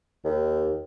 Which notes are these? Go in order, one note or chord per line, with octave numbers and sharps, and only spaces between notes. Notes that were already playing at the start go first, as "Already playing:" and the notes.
D#2